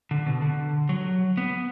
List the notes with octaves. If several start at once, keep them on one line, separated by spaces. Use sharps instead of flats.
D3
B2
D3
F#3
B3